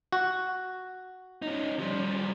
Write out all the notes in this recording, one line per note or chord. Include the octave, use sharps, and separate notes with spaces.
F#4
C#4 D#4
F3 G3